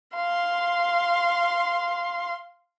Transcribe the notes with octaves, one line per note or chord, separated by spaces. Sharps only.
F5 C6